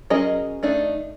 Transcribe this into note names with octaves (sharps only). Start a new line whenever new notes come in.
F#3 C#4 G#4 A#4 D#5
A3 D4 D#4